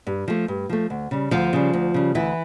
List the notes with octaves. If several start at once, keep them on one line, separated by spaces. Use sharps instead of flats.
G2
F3 A3
G2
F3 A3
D2
C#3 G3
D2 F3 F4
C#3 G3
D2
C#3 G3
D2 E3 E4